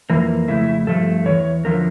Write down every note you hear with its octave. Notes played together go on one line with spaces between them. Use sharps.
F2 E3 A#3
F2 C#3 A3 E4
G2 F3 A3 A4
E2 E3 C#5
E2 D3 F3 A#4